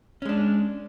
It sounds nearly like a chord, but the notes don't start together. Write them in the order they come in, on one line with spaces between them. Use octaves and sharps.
C#4 G#3 D4